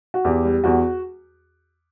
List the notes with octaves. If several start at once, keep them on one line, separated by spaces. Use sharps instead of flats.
F#4
E2 G4
G3
E2 F#4